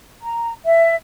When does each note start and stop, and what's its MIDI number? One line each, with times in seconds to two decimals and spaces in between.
0.22 0.51 82
0.65 0.95 76